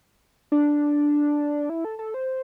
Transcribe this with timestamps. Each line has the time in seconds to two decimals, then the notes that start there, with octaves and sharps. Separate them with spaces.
0.52 D4
1.69 E4
1.85 A4
1.99 A4
2.14 C5